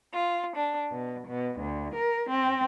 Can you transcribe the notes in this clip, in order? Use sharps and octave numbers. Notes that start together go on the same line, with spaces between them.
F4
D4
B2
B2
D2
A#4
C4